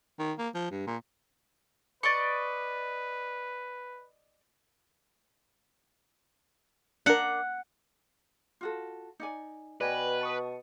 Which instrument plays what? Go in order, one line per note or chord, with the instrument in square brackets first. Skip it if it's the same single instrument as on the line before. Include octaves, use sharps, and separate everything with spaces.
[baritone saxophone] D#3
A#3
F3
G2
A#2
[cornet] B4 [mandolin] D5 D#5 C#6
[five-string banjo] D4 A#4 [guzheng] F#5
[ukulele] F4 F#4 A4
D#4 D5 G#5
[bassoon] B2 [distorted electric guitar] B4 [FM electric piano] D5 G#5 B5 [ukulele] D#5 G5
[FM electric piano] A5 C#6 D#6